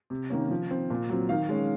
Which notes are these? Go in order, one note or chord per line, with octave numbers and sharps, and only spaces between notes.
C3
D#3 A#3 C#4
F3
C4
A#2
F#3 C4
D#3 F5
G#3 C#4